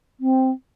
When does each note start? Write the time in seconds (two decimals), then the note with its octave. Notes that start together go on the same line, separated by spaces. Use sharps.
0.20 C4